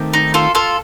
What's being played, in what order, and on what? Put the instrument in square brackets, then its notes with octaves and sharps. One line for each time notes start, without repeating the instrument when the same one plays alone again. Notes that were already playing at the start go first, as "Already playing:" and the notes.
Already playing: [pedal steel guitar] D#3 A3 C4 G4 A#4
[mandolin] D#4
F4 A4
F4 A4